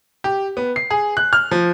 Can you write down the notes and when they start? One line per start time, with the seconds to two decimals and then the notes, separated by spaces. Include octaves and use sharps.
0.24 G4
0.57 B3
0.76 C7
0.90 G#4
1.17 F#6
1.33 F6
1.51 F3